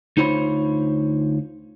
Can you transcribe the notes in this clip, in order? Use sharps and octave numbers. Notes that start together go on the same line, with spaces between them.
D2 D#4 F4 C5 C#5 B5